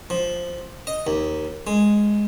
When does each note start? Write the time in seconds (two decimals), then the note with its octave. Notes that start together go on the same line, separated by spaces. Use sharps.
0.10 F3
0.87 D#5
1.07 D#2
1.67 G#3